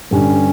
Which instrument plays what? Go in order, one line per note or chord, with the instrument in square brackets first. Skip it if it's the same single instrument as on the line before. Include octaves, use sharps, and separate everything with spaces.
[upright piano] G2 D3 G3 D4 G4 [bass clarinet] C#4